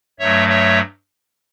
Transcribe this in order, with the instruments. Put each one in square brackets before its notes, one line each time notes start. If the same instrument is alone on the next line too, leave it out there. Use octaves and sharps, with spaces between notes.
[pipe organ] G2 F#3 A3 C#5 E5
C#5 E5